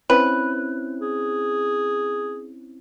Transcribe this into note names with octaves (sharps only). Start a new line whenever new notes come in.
C4 C#4 E4 B4
G#4